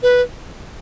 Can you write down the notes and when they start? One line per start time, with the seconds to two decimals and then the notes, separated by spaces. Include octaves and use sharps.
0.03 B4